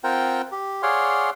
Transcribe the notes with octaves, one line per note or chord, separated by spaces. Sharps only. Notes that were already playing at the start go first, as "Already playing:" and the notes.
C4 F4 A#4 C5 F#5 G5
G4
G#4 C#5 D5 F5 F#5 C6